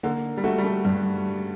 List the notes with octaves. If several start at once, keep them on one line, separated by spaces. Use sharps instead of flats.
D3 A#3
G3
A3 F#4
G3
A3
G2 G3